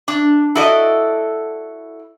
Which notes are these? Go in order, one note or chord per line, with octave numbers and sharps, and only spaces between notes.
D4
E4 F#4 A4 D5 D#5